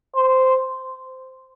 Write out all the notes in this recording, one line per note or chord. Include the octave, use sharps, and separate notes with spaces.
C5